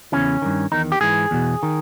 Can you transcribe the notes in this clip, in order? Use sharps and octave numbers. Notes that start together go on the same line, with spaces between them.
E2 C#3 E3 C#4
G2 D#3
E2 D#3 D#4
G4
G#2 E3 G#4
E2 B2
D#3